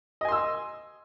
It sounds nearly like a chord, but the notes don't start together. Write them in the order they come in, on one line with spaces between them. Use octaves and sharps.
D#5 G#5 C6 E6 D#6